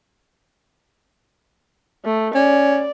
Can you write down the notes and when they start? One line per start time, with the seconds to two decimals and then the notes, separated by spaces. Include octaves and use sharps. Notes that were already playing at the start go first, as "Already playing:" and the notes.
2.05 A3
2.35 C#4 D5